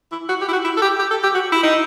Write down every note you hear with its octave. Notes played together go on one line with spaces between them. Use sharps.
E4
F#4
G4
E4
F#4
E4
A4
G4
G4
A4
G4
F#4
E4
D#4